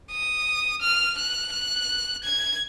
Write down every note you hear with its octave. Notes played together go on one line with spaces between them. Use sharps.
D#6
F6
F#6
F#6
G#6